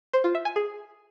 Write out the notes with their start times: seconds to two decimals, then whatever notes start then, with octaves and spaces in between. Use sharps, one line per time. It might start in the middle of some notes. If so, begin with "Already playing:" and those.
0.13 C5
0.24 F4
0.35 E5
0.45 G#5
0.56 G#4